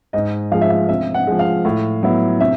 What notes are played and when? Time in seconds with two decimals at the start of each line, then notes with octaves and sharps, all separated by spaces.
0.13 G#2 D#5
0.52 F3 G#3 F5
0.61 E5
0.70 F5
0.89 C3 E5
1.14 F#5
1.27 F3 G#3
1.39 F5
1.65 A2
2.03 F#3 B3 E4
2.40 C3 E5